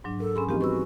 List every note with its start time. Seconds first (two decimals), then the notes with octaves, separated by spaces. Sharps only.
0.04 G#2 F#3 D4
0.20 A4 A#4
0.36 C#4 G#4 B5 C6
0.49 E3 F3 A#3 C4 D#4 G4
0.61 G3 B3 F#4 B4 C#6 E6